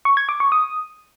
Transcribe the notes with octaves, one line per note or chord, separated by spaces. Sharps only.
C#6
G#6
D6
C#6
D#6